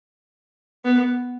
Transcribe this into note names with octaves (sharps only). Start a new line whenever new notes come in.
B3